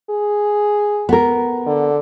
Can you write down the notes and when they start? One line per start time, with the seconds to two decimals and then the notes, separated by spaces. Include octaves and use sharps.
0.10 G#4
1.09 B3 A#4
1.67 D3